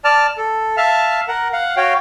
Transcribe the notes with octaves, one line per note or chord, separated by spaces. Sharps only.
D5 A5 F6
A4
E5 F5 A5 F6
A#4 F#5
F5 F#5
F#4 C#5 F5 G5